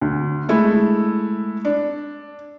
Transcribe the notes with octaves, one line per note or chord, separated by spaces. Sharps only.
D2
G#3 A3 E4
D4